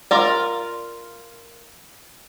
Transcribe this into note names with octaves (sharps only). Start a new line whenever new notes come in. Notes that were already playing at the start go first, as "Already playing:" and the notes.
F4 A#4 D5